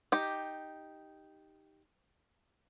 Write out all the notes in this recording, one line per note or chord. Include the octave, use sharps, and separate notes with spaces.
D#4 G4